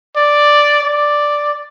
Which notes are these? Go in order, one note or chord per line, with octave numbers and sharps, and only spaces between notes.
D5
D5